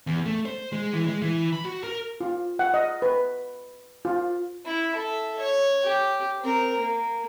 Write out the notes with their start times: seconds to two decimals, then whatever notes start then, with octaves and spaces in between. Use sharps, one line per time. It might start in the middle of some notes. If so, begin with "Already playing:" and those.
0.07 E2
0.26 A3
0.46 C5
0.73 G#3
0.93 E3
1.07 G#3
1.22 E3
1.53 B5
1.65 F#4
1.84 A#4
2.21 F4
2.59 F#5
2.74 D#5
3.02 B4
4.05 F4
4.65 E4
4.95 A4 E5
5.39 C#5
5.83 G4
6.41 C4 A#4
6.78 A#3